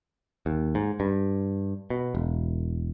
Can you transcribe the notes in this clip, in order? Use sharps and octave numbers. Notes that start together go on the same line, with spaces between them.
D#2
G#2
G2
B2
E1